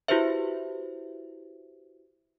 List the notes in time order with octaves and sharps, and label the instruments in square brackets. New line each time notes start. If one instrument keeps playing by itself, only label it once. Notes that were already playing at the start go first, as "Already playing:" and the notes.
[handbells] E4 F#4 G4 B4 C5 E5